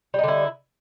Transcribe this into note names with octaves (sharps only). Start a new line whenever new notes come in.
D3 G3 D#4 E4